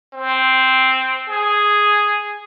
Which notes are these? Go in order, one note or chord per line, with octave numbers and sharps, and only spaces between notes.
C4
G#4